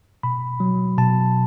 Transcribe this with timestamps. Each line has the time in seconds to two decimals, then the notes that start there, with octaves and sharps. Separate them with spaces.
0.23 B2 B5
0.60 F#3
0.98 B2 A5